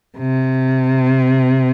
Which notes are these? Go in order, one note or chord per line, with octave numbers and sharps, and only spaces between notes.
C3